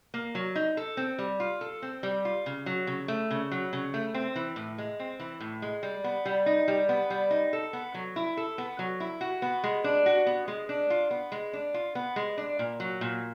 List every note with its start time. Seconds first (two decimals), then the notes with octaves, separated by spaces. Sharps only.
0.14 A#3
0.35 F#3
0.55 D#4
0.77 A4
0.97 C4
1.18 G3
1.40 F4
1.61 A4
1.82 C4
2.03 G3
2.25 F4
2.46 C#3
2.66 F#3
2.87 C#3
3.08 A3
3.31 C#3
3.51 F#3
3.73 C#3
3.94 A3
4.14 C4
4.36 E3
4.56 A2
4.78 G#3
4.99 C4
5.20 E3
5.40 A2
5.62 G#3
5.83 G3
6.04 B3
6.26 G3
6.46 D#4
6.68 G3
6.89 B3
7.10 G3
7.31 D#4
7.53 A4
7.73 B3
7.94 F#3
8.16 E4
8.37 A4
8.58 B3
8.79 F#3
9.00 E4
9.21 F#4
9.42 B3
9.64 G#3
9.84 D4
10.06 F#4
10.27 B3
10.48 G#3
10.69 D4
10.90 F4
11.11 B3
11.32 G#3
11.53 D4
11.74 F4
11.95 B3
12.16 G#3
12.37 D4
12.59 A#2
12.80 F#3
13.01 A#2